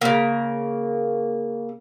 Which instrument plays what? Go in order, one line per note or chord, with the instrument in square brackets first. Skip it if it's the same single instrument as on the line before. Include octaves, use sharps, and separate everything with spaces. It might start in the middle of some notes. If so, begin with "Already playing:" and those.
[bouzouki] C#3 A#3